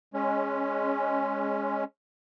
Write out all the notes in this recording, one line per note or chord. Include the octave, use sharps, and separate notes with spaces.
G#3 C#4